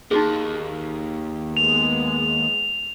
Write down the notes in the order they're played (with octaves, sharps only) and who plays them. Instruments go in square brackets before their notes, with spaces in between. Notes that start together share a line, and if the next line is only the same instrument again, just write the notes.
[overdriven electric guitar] D#2 [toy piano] D#4 F#4 G#4
[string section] G#3 B3 [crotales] F7